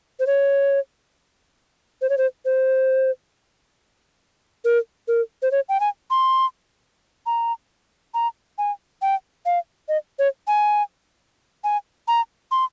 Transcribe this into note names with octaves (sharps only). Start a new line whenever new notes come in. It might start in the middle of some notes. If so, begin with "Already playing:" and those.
C5
C#5
C5
C#5
C5
C5
A#4
A#4
C5
C#5
G5
G#5
C6
A#5
A#5
G#5
G5
F5
D#5
C#5
G#5
G#5
A#5
C6